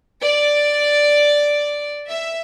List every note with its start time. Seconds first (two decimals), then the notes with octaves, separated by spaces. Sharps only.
0.23 D5
2.08 E5